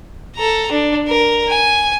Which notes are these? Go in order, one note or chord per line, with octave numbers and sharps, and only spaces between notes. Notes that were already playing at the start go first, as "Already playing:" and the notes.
A4 A#5
D4
A#4
G#5